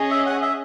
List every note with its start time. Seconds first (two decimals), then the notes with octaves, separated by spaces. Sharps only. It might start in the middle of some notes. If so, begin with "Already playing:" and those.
Already playing: C#4 G#4 D#5
0.11 E5
0.26 F#5
0.42 E5